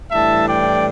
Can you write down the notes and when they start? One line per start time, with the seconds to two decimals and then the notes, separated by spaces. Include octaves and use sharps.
0.11 A2 E3 G3 D4 E5 A5
0.48 D5 G5